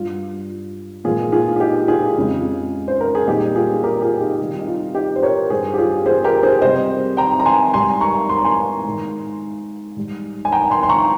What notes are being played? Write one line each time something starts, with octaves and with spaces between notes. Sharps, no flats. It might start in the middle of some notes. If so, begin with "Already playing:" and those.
Already playing: G2 G3 F4
A#2 F3 G#3 F4 G#4
F4 G#4
G#4
D#4 G4
F4 G#4
F2 C#3 G#3
C5
A#4
G#4
A#2 G3 D#4 G4
F4 G#4
G4 A#4
F4 G#4
D#4 G4
C3 D#3 G3
D#4
F4
D#4 G4
C5
A#4 C#5
G2 G3 G#4 C5
G4
F4 G#4
G#4 C5
G4 A#4
G#4 C5
C3 G3 C5 D#5
G5 A#5
A#5
G#5 C6
G#2 G3 G#5 C6
A#5 C#6
C6
A#5
G#5 C6
G#2 D#3 G#3
G#2 G3
G#5
G5 A#5
G#5 C6
C6
A#5 C#6